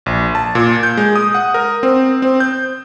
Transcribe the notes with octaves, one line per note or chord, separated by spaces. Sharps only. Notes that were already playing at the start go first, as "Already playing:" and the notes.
A#1
A5
A#2
G6
G#3
D#6
F#5
A#4
C4
C4
G6